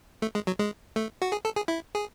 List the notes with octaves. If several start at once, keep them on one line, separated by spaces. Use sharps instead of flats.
A3
G#3
F#3
G#3
A3
F#4
G#4
A4
G#4
E4
G#4